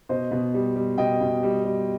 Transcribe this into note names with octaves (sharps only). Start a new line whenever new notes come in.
B2 C5 D#5
B2
G3
G3
B2 D#5 G5
B2
G3
G3